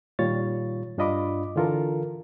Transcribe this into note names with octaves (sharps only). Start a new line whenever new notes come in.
A#2 D#3 G3 F4 C#5 A6
G2 D4 F4 D#5 B5 D6
D3 E3 F4 A4 A#4